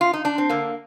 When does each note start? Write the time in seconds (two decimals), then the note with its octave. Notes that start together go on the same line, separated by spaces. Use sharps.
0.01 F4
0.13 D#4
0.25 D4
0.38 C4
0.50 D3 A#3